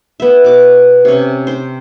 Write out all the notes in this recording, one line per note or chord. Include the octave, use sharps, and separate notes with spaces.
B3 E5
B2 D6
C3 C#4
C5 G5